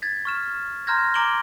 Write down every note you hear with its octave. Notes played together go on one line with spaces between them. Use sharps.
G#6 A6 B6
C#6 F6 E7
A#5 C6 F6 G6 G#6 A#6
A#5 D6 D7 E7 F#7 G7